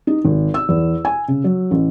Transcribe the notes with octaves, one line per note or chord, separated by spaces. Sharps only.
D#4
G#1
E6
E2
G#5
C#3
F#3
A1